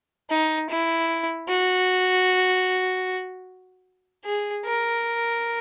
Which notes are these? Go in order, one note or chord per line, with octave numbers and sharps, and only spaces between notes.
D#4
E4
F#4
G#4
A#4